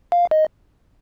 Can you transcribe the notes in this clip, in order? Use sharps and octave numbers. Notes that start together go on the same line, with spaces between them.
F5
D#5